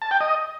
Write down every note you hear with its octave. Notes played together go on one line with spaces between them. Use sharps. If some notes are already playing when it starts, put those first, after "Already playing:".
A5
G5
D#5